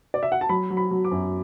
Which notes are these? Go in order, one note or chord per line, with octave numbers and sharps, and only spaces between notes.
D5
E5
F#5
A5
F#3 B5
F#3
B5
F#3
D6
F#2